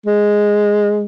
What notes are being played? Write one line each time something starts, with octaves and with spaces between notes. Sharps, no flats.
G#3